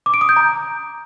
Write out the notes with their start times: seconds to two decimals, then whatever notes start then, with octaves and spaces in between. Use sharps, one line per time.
0.06 D6
0.14 D7
0.21 D#6
0.29 G6
0.36 A#5